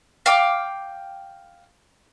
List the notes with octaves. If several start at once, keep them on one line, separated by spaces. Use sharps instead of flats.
F5 G5 D6